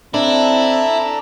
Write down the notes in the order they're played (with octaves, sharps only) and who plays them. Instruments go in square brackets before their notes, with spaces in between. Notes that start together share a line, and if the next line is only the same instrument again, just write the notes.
[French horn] C4 [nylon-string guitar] D4 [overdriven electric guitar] E4 [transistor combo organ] A4 D5 A#5